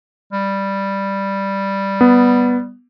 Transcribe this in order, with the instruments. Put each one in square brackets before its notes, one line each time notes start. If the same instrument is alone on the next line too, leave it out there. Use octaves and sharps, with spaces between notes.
[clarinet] G3
[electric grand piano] B3